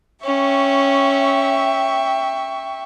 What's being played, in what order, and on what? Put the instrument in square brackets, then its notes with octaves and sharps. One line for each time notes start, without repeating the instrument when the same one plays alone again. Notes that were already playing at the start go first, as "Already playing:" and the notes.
[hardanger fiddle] C#4 [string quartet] E5 G5 C#6